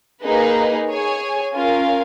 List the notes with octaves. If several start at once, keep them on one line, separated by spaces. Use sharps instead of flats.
A#3 D#4 G#4 B4
G#4 C#5 G#5
C#4 F4 A#4 F5 G#5